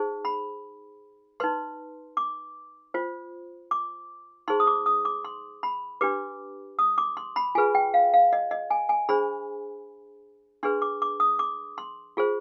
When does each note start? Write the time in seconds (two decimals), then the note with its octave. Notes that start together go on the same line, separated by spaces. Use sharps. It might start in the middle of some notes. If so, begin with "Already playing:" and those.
Already playing: D#4 G#4 C5
0.25 B5
1.40 D#4 B4 C6
2.17 D6
2.94 F4 C5
3.71 D6
4.48 D#4 G#4 C5 C6
4.60 D#6
4.67 D6
4.86 D#6
5.05 D6
5.25 C6
5.63 B5
6.01 D4 G4 B4 D6
6.79 D#6
6.98 D6
7.17 C6
7.36 B5
7.55 F4 G#4 B4 G#5
7.75 G5
7.94 F5
8.14 F5
8.33 D#5
8.51 D#5
8.70 G#5
8.89 G#5
9.09 D4 G#4 C5 B5
10.63 D4 G#4 B4 C6
10.82 D6
11.02 D6
11.20 D#6
11.39 D6
11.78 C6
12.17 F4 G#4 C5